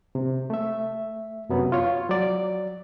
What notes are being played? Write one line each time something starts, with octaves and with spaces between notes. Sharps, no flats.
C3
A3 E5
F#2 C3 F#3 B3
F4 C#5
F#3 D5